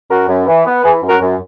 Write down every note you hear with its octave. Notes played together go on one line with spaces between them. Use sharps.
F#2 F#4 A#4
F#2
E3
B3
E3 G#4 B4
F#2
F#4 A#4
F#2